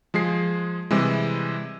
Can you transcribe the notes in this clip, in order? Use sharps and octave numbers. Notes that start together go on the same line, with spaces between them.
F3 G#3 G#4 C7
C3 E3 G3 G#3